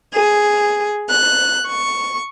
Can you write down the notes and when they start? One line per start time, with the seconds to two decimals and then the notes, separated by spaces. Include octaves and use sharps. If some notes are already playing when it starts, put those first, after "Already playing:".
0.15 G#4
1.10 F#6
1.66 C#6